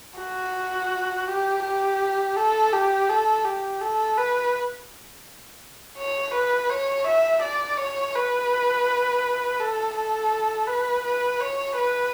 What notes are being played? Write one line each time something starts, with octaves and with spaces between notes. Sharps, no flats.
F#4
G4
G4
A4
G4
A4
G4
A4
B4
C#5
B4
C#5
E5
D5
C#5
B4
A4
A4
B4
B4
C#5
B4